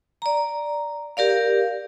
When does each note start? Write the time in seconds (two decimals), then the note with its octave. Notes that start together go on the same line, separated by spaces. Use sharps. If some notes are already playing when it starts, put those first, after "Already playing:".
0.22 D5 A#5
1.17 G4 A#4 D5 F5